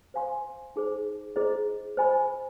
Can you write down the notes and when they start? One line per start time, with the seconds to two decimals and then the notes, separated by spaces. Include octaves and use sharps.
0.14 C5 F5 G#5 C6
0.76 D#4 G#4 C5
1.36 E4 G#4 C5 D#5
1.97 C5 D#5 G#5 B5